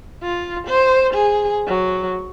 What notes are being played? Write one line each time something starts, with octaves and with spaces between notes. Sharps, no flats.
F4
C5
G#4
F#3